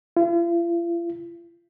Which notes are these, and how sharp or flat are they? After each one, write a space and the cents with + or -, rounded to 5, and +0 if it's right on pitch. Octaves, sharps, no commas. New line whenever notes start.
F4 -45